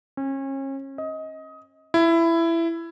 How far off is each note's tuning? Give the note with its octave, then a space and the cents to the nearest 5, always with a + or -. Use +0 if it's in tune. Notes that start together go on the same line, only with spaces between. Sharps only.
C#4 -35
D#5 +20
E4 +15